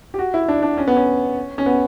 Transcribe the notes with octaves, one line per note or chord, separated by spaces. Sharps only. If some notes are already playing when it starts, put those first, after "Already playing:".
G4
F#4
E4
D4
D4
C#4
B3
C#4
C#4
B3